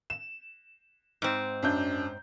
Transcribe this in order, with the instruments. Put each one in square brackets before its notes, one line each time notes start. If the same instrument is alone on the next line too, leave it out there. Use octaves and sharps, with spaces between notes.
[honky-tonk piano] E7
[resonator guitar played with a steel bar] G#2 C4
[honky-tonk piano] F#2 D4 G6